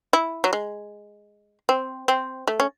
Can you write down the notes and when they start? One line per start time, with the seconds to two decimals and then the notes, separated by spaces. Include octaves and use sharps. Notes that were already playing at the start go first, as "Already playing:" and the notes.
0.13 E4
0.44 F#3
0.53 G#3
1.69 C4
2.08 C4
2.48 A3
2.60 C#4